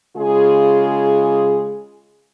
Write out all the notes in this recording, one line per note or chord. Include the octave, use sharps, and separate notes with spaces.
C#3 G#3 F4 G#4